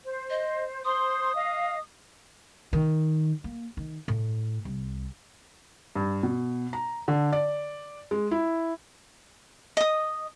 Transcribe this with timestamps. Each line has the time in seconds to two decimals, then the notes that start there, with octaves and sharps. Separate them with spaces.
0.04 C5
0.30 D#5
0.85 C5 C6 D#6
1.35 D#5 F5
2.73 D#3
3.44 A#3
3.77 D#3
4.08 A2
4.65 C2
5.96 G2
6.23 B2
6.73 A#5
7.08 D3
7.33 D5
8.11 G#3
8.31 E4
9.77 D#5 D#6